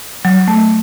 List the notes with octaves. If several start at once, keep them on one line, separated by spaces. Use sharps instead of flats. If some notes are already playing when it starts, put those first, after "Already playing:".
F#3
A3